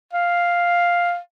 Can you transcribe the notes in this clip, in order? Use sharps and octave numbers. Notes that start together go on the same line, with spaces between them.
F5